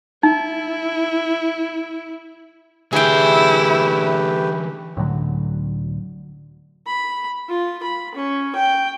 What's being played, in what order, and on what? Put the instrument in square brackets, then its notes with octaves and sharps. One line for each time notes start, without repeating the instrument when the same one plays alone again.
[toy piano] D#4 [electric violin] E4
[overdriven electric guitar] D3 E3 [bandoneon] A3 G4 B4 [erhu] E4 [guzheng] G#4 G5
[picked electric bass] C#2 A2 D3 F#3
[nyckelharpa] B5
F4
B5
C#4
G5